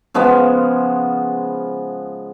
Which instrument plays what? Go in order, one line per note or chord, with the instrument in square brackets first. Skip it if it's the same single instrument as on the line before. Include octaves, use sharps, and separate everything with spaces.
[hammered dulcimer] C#3 F3 G#3 B3